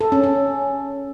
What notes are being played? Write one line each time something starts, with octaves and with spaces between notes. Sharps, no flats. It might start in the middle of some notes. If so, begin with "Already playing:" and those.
A4
C#4
C#4